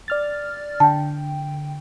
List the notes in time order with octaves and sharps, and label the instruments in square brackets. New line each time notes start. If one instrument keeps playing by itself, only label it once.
[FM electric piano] D5 F6 A6
[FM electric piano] D3 G5 [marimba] A5